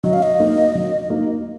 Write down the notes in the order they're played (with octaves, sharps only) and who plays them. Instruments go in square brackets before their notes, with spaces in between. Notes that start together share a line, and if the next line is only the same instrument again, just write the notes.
[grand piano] F#3 [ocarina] D#5
[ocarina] F5
D#5
[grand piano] A#3 D#4
F#3
A#3 D#4